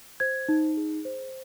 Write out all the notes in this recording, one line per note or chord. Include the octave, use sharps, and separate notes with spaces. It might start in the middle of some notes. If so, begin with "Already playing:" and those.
C5 G#6
D#4
G#4
C5